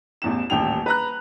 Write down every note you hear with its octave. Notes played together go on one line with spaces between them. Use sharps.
A1 E2 E7
D#1 A1 G5 F7
B4 A#5 F#6